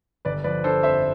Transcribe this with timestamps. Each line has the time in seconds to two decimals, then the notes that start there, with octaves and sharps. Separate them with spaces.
0.25 G1 B4 D5
0.44 F3 B4 D5
0.64 D3 A4 C5
0.83 F2 C5 E5